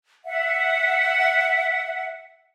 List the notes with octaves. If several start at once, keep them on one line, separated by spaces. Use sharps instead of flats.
E5 F#5